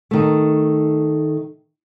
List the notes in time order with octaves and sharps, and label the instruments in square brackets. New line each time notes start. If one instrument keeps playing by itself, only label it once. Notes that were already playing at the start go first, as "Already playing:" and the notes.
[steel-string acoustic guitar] D#3 A3